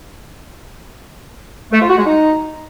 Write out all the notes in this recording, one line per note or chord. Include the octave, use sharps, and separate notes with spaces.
A3
F4
F#4
G#3
D#4